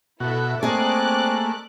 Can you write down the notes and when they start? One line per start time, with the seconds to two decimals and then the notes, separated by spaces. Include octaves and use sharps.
0.20 B2 E4 F#4 A4 E5
0.63 A3 A#3 C4 G#4 D5 D#5 D6 F#6